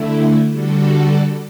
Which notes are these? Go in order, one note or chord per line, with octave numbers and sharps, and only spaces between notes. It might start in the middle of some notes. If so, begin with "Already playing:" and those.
Already playing: D3 A3 E4
D3 G3 D4 F#4 A4